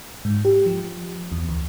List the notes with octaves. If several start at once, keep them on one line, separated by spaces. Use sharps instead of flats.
G#2
G4
F3
E2
D2